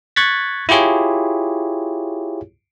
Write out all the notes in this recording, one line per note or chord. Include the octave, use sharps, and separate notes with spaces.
C#6 F#6 G#6 A6 B6
E4 F4 G4 G#4 C#5